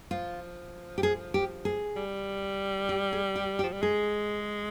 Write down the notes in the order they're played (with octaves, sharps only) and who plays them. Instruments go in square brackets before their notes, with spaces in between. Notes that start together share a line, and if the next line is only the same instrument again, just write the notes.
[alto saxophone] F3 [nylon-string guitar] F4
[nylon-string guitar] G4
G#4
G4
G#4
[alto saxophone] G3
[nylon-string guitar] G4
G#4
G4
G4
[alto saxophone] F3
G3
[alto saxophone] G#3 [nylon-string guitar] G#4